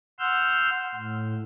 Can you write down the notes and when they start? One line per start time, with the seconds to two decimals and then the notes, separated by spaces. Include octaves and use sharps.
0.19 F#5 C6 E6 F6 G6
0.95 A2